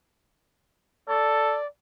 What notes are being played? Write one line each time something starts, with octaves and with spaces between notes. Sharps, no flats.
A4 D5